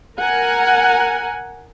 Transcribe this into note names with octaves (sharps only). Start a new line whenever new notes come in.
A#4 F#5 G#5 A#5